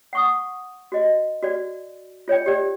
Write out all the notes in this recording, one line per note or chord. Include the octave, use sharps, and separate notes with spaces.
F#5 C#6 D#6
F#4 D#5
F#4 D5
F4 C#5 D5 G5
G4 D5